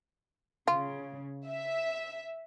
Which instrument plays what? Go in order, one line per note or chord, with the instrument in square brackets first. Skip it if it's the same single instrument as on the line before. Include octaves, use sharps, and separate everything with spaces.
[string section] C#3 [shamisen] F4
[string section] E5